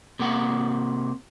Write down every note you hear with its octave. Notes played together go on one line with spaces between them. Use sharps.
C3 A#3 F#5